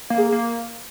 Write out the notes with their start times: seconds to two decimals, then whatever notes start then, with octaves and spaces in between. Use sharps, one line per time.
0.10 A#3
0.18 G#4
0.32 A#3